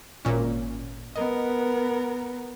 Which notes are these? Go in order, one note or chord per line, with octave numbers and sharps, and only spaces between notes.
G#1 A#2 C#4
B3 A#4 D#5